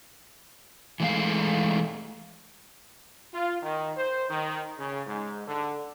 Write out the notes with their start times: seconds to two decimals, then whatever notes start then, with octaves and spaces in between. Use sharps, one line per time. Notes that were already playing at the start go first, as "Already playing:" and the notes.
1.00 E3 G#3 A3 F5
3.34 F4
3.62 D#3
3.96 C5
4.29 D#3
4.78 C#3
5.07 G#2
5.47 D3